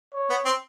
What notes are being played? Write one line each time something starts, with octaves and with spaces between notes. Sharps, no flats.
C#5
B3
C4